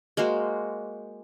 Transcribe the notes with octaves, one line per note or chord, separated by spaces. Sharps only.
G#3 A#3 F#4 C5